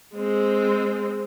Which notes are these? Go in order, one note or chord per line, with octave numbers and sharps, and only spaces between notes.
G#3 C4